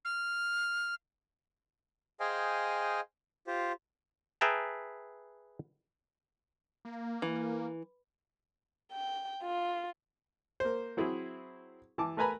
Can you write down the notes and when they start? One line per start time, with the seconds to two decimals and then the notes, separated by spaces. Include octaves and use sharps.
0.05 F6
2.20 G#4 C5 D#5 F5 G5 G#5
3.47 F4 G4 C5
4.41 G#4 B4 E5 G5 A5 A#5
6.85 A#3
7.22 E3
8.92 G5
9.43 F4
10.60 A#3 C5
10.97 F#3 C4 E4 G#4
11.98 E3 A5 D6
12.17 A3 A#4 B4 G#5 A#5 B5